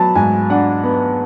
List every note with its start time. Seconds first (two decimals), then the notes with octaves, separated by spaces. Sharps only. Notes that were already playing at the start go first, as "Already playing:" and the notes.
Already playing: F#3 B3 A5 B5
0.15 G#2 G#5
0.50 D4 F#5
0.84 B3